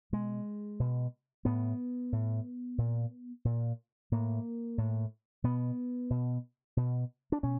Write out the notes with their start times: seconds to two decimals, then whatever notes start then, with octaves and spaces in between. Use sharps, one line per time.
0.12 B2 G#3
0.80 B2
1.45 A2 B3
2.12 A2
2.78 A#2
3.45 A#2
4.12 A2 A#3
4.78 A2
5.44 B2 B3
6.10 B2
6.77 B2
7.32 D4
7.43 B2 C#4